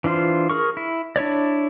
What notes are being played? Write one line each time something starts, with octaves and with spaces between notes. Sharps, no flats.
E3 D4 F4 C5
G#4 A#4 C#6
E4
D4 E4 C#5 D5